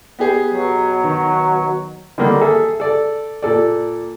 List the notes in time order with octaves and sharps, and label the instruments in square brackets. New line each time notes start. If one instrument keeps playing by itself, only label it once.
[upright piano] B3 G4 G#4
[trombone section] B2 F#3
[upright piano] D#3
[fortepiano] D3 D#3 G3 A#3 D4
G#4 A4 E5
A4 D5
A#2 A4 D5